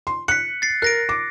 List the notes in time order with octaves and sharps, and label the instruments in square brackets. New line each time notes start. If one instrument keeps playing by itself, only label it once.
[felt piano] C6
[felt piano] F#6 [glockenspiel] B6 C#7
[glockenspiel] A6 C7
[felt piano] A#4 [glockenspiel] F#6 A#6 D7
[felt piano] D6